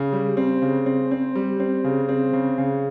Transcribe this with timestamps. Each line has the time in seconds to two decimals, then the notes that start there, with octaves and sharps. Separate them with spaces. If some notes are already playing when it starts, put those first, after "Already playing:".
Already playing: C#3
0.13 G3
0.37 C4
0.62 C#3
0.86 C4
1.11 C4
1.35 G3
1.60 C4
1.84 C#3
2.09 C4
2.33 C#3
2.58 C#3